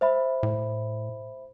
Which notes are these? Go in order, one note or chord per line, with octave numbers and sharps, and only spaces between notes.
C5 E5 B5
A2